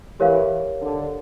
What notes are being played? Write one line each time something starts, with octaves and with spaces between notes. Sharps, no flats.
E3 G4 A#4 C#5 F5
D3